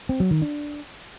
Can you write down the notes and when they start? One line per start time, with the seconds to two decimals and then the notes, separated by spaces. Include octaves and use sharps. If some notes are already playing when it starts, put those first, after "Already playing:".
0.09 C4
0.20 F#3
0.31 D#3
0.42 D4